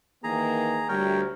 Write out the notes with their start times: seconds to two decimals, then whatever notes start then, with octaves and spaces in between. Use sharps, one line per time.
0.24 D#3 E3 A#3 G#4 A#5
0.89 D2 G3 A#4 C#5 G5